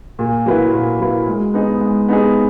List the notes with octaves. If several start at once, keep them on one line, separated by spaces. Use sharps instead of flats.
A#2
F#3 A#3 E4 B4
A#2
F#3 A#3 E4 B4
G#3
B3 D#4 G#4
G#3
B3 D#4 G#4